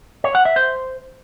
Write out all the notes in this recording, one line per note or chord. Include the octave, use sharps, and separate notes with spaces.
C#5
F#5
E5
C5